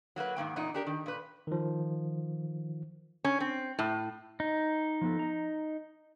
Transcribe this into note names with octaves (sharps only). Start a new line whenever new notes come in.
F#3 A#3 F#4 B4
G#2 D#3 A#3 G5
E2 A#2 D#4
D4 G4 A#4
D#3
A#2 B4
D#3 F3
C#4
C4
A2
D#4
F3 B3 A4
D#5 A#5